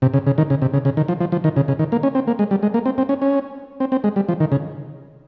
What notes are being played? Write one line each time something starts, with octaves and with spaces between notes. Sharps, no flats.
C3
C#3
C#3
D#3
C#3
C3
C#3
C#3
D#3
F3
F3
F3
D#3
C#3
C#3
D#3
A#3
C#4
C4
A#3
G#3
G3
G#3
A#3
C4
C4
C#4
C#4
C4
C4
G#3
G3
F3
D#3
C#3